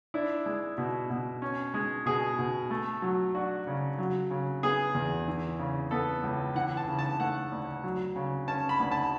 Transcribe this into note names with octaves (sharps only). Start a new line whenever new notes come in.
D4 E4
G#3
B2
B2
C#4
G#3
B2 G#4
B2
A3
F#3
D4 F#4
C#3
F#3
C#3
B3 G#4
E2
E3
C#3
B3 A4
C#2
E3 F#5
A5
C#3
A5
A3 F#5
D2
F#3
C#3
C#4 A5
B5
D2
A5